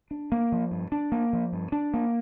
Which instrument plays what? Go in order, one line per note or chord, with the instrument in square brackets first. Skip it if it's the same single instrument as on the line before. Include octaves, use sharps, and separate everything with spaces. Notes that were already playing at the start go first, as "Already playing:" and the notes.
[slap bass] D4
A#3
F3
G2
D4
A#3
F3
G2
D4
A#3